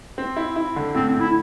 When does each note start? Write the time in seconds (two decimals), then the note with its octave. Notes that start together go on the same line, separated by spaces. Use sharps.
0.18 C4
0.36 E4
0.56 E4
0.76 D3
0.95 A2 C4
1.08 C4
1.14 A2
1.20 E4